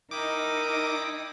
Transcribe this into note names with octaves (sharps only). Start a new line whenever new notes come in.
D#4 E4 A#4 G5 D6 D#6